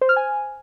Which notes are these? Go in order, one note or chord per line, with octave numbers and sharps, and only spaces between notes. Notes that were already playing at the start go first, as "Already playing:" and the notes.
C5
F6
G#5